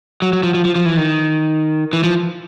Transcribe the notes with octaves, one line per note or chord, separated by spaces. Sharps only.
F#3
F#3
F3
F3
F3
F3
E3
D#3
E3
F3